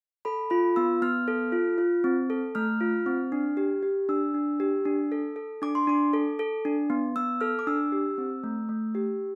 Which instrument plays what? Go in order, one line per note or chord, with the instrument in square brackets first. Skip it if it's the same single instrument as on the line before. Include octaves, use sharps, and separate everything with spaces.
[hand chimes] A4 B5
F4 B5
B3 E6
B3 F6
A4
F4
F4
C4
A4
A3 F6
F4
C4
D4
G4
G4
D4 E6
D4
G4
D4
A4
A4
D4 D6
C6
D4 D6
A4
A4
D4
B3
B3 E6
A4 F6
D6
D4 E6
G4
C4
A3
A3
G4